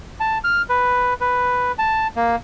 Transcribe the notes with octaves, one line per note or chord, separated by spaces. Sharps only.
A5
F6
B4
B4
A5
A#3